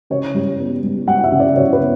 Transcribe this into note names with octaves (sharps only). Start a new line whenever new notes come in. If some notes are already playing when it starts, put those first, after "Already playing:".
C#3 C#5
G3
B3
G3
G3 F#5
E5
C#3
D5
C#3 C#5
B4
B3